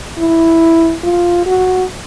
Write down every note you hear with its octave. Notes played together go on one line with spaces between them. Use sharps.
E4
F4
F#4